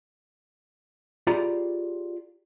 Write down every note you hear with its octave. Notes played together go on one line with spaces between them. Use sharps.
F4 G4 G#4 D5 A#5 B5